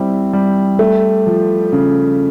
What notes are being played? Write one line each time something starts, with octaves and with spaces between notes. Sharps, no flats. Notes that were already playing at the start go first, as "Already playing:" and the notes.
Already playing: G3 C4 E4
G3
A3
F3
C#3